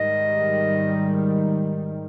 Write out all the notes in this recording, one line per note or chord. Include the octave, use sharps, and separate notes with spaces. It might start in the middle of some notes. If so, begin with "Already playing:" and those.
Already playing: G#2 D#3 G3 D#5